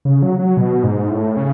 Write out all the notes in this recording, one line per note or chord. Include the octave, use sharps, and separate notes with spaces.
C#3
F#3
F#3
B2
G#2
A2
C#3